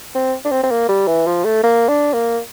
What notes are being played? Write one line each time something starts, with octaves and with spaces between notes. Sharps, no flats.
C4
D4
C4
C4
A#3
G3
E3
F3
A3
A#3
D4
A#3